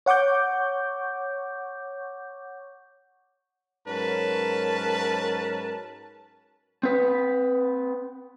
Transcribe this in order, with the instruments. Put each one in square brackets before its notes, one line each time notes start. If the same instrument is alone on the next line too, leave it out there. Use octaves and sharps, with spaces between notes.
[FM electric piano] C#5 F#5 C#6 D6 G6
[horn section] G#2 F#3 C#4 A#4 B4 A5
[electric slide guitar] C4 B4